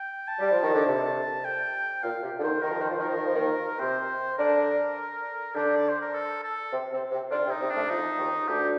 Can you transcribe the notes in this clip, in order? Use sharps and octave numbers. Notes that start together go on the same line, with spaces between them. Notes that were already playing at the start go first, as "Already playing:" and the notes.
Already playing: G5
A5
G3
F3
D#3
D3
C3
G5
A#2 F5
C3
D3
D#2 D#3 C5
D#3 A#4
F3
D#3 C5
F3
D#3 A#4
F3
D#3
F3
D#2 D#3
C3 C4 C5
D3 D4 A#4
D3 D4 G4
D5
C5
A#4
A4
A4
C3 C4
C3 C4
C3 C4
D3 D4 F4
C3 C4
D#4
C3 C4
A2 A3 D4
F2 F3 D#4
D#2 D#3
D2 D3 G4